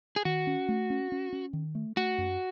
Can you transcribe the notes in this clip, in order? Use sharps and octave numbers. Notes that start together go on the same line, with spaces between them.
G#4
D#3 F#4
C#4
A3
C#4
C#4
C#4
D#3
A3
A3 F#4
F#2